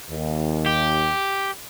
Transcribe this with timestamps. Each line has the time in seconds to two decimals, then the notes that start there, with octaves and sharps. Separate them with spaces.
0.11 D#2
0.66 G4